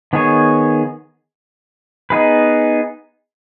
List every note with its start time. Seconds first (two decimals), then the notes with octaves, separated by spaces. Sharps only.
0.13 D#3 B3 G#4 C#5
2.10 B3 D#4 G#4 B4